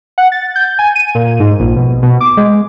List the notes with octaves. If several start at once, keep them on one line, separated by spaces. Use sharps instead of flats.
F#5
A6
G6
G#5
D#7
A#2
G#2
A#1
B2
B2
D6
G#3